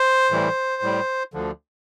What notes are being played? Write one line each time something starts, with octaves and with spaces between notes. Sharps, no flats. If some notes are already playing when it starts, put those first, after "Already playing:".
Already playing: C5
A2 E3 G3
A2 G3
D2 D3 F3